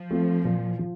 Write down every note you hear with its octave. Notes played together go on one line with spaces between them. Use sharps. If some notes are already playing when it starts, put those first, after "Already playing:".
Already playing: F3
A3 C4 F4
A#2
F3